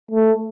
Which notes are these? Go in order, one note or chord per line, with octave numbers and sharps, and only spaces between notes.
A3